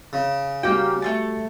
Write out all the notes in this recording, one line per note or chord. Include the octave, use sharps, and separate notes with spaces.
C#3
G3 A#3 C#4 F#4 G5
A3 C4 A5